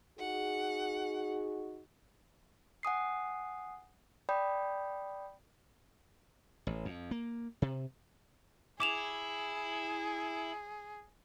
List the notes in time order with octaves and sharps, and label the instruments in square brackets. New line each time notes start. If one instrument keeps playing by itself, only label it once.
[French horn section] D#4 F#4 G#4 [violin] F#5
[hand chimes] F#5 G#5 D#6 C7
D5 G5 B5 D#6 G6
[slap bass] A1
F2
A#3
C3
[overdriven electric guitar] E4 [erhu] G#4 [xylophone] D6 E7 F7